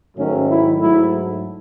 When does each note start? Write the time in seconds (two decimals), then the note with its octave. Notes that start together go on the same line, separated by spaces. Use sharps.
0.16 G#2 D#3 F#3 A3 C#4
0.49 E4
0.79 G#2 F#3 A3 E4